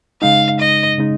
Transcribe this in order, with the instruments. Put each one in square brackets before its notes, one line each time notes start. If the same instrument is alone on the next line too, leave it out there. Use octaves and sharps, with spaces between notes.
[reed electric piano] C#3 G#3 D#4 [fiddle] F5
[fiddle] D#5
[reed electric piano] C#3 G#3 D#4